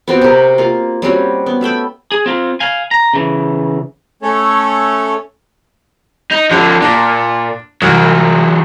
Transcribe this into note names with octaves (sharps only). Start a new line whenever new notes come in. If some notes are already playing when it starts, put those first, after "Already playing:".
B3 C4 F#4 G4
C3 A#4
A#3 F4
G3 C4 C#4 F#4
B3
A3 E5 G5 B5
G#4
C4 F4
F5 G#5
A#5
C#3 E3
A3 C#4 A4 C#5
D#4
D3 F3 C#4
A#2 D4
C2 E3 F#3